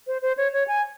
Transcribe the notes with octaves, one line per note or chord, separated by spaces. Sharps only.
C5
C5
C#5
C#5
G#5